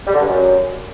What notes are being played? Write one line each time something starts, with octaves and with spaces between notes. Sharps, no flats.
G3
D3
G2
F#2